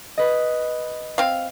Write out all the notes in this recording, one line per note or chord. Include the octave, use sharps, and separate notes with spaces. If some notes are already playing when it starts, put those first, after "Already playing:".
B4 D#5
C4 F5